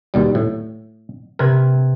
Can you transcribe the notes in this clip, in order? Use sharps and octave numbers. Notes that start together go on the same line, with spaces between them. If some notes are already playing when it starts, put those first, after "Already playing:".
D#2 B2 G3
A2
C3 A#4 B4 G#6